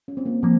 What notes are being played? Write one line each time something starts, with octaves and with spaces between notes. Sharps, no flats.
C#4
C4
A#3
F3 A#3 C4